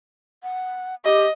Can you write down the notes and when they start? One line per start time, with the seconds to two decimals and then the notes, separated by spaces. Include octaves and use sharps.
0.43 F#5
1.05 G4 D#5